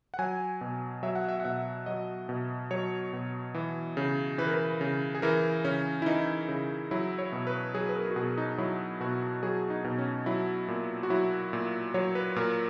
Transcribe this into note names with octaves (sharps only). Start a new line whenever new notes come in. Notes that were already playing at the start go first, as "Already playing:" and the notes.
F#5
F#3 G#5
B2
F#3 E5
F#5
E5
F#5
B2 E5
F#3 D#5
B2
F#3 C#5
B2
E3
C#3
E3 B4
A#4
B4
C#3
G#4
E3 A#4
C#3 C#4
E4
E3 D#4
C#3
F#3 E4
C#5
B2
B4
F#3 G#4
B4
A#4
F#4
B2 G#4
D#4
F#3 E4
B2 F#4
F#3 G#4
D#4
B2
C#4
F#3 E4
A#2
F#4
F#3 E4
A#2
F#3 C#5
B4
A#2 A#4